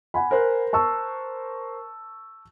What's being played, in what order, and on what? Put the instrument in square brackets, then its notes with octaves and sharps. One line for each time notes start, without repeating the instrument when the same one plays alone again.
[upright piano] F#5 G#5 B5
[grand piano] A#4 C5 F#6
[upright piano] A5 C#6 E6